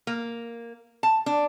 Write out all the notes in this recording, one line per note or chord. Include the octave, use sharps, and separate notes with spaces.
A#3
A5
D4